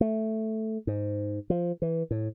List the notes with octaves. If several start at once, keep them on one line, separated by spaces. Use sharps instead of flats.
A3
G#2
F3
E3
A2